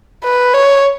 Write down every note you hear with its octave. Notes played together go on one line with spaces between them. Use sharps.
B4
C#5